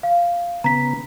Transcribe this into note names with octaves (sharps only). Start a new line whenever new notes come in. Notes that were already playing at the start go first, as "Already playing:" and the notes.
F5
C#3 B3 A#5 B6